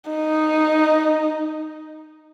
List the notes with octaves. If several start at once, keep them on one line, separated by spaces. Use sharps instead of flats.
D#4